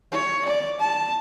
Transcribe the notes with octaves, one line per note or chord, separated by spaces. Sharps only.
C#5
D5
A5